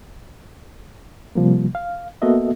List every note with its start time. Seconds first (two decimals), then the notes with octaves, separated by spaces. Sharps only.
1.35 C3 F3 G3 A#3
1.75 F5
2.22 A#3 B3 F#4 A4 D#5 E5